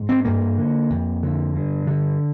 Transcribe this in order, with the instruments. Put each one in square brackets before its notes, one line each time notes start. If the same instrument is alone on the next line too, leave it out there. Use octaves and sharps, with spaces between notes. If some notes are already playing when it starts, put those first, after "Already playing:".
Already playing: [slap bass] G#2
C4
G2 A#3
D3
F2
D3
G2
D3